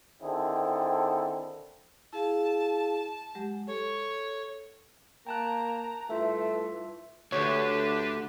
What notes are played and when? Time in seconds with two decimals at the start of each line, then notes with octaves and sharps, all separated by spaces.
0.21 D3 D#3 C4 E4 G#4 A4
2.13 E4 G#4 F5 A5
3.35 F#3 G#3 G4
3.67 A4 C#5
5.27 A#3 G5 A5 A#5 F#6
6.10 G2 E3 A3 F4 E5
7.32 D2 D3 D4 G4 B4 C#5